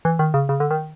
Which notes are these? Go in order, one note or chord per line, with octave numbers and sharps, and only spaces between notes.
E3
D#3
C#3
C#3
D3
D#3